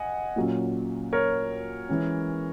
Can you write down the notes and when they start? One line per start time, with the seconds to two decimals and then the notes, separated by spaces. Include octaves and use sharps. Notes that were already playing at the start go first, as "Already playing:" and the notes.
Already playing: D#5 F#5 G#5
0.36 A#2 F#3 C#4
1.13 A#4 C#5
1.89 E3 G#3 C#4